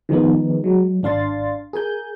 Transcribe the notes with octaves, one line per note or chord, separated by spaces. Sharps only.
D#3 F3 G#3 B3 D#4
F#3 G#3
G#1 D4 F5 C6 A6
G#4 A#4 G#5 G6